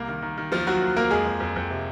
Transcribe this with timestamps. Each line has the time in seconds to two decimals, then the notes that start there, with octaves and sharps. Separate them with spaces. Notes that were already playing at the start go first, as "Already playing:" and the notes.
Already playing: C2 A#3
0.09 D#3
0.22 D#3
0.38 D#3
0.52 D#2 F3 F4
0.67 D#3 F#3 F#4
0.82 D#2
0.96 A#3 A#4
1.11 F2 G#3 G#4
1.26 F2
1.40 F2
1.56 F2
1.70 C3